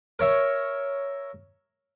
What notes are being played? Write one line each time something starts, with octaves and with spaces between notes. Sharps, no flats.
A#4 C#5 E5